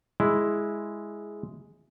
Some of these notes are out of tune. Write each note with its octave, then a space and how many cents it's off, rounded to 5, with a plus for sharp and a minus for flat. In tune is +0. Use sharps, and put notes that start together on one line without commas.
G#3 +0 E4 +0